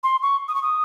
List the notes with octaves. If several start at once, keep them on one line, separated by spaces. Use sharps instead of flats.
C6
C#6
D#6
C#6
D#6